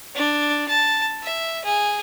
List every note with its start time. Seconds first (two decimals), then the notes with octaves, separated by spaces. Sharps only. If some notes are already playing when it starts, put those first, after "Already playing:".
0.15 D4
0.68 A5
1.22 E5
1.64 G#4